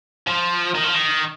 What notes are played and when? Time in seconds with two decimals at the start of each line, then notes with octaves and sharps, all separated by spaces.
0.27 F3
0.74 D#3
0.84 F3
0.94 D#3